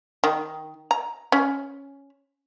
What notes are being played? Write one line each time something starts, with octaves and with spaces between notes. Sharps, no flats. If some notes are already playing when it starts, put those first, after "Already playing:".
D#3
A#5
C#4